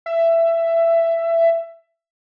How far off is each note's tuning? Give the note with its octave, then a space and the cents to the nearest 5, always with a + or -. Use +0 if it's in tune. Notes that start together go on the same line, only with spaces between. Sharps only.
E5 +15